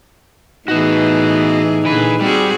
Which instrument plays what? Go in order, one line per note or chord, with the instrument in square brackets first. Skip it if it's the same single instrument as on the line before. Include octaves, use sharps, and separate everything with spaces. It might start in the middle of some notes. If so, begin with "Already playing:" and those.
[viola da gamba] A2 E3 G#4 [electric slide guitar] B3 F#4 [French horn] D#4
[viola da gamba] A#2 D3 G#4 [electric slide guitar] E3 B4
[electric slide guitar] G3 [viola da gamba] C4 F#4 G#4